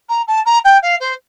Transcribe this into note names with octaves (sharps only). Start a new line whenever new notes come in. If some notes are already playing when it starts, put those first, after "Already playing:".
A#5
A5
A#5
G5
F5
C5